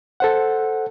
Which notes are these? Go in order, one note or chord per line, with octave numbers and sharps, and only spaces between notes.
A4 C5 F#5